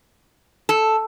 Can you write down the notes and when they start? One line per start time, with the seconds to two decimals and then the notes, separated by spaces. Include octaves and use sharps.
0.69 A4